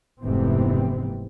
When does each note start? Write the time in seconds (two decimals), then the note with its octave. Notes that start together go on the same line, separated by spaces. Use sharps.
0.23 F1 G#2 C3 E3 B3 C4